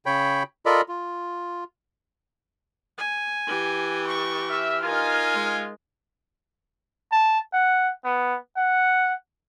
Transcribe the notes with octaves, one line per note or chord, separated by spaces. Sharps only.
C#3 C#5 G5 B5
F4 A4 A#4 D5 D#5 B5
F4
G#5
E3 G4
C#6
E5 F6
D#4 F4 A#4 G#5
G#3
A5
F#5
B3
F#5